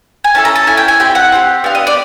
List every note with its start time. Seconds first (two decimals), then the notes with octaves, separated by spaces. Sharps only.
0.24 G#5
0.34 C#4 E4 A4 A5
0.45 A#5
0.55 A5
0.67 C#4 E4 A4 G#5
0.77 G5
0.88 G#5
1.00 C4 E4 G4 G5
1.15 F#5
1.32 C4 E4 G4
1.64 B3 D4 G4 F5
1.75 D#5
1.87 D5